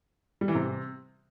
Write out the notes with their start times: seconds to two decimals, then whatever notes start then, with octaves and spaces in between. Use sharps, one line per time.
0.41 G3
0.48 E3
0.55 C3